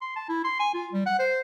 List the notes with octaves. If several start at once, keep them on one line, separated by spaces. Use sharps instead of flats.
C6
A5
E4
C6
G#5
F4
G3
F#5
C5